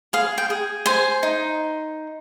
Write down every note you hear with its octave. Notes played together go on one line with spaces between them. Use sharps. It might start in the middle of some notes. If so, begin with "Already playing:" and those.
G#4 F5
G5
G#4
C5 G#5
D#4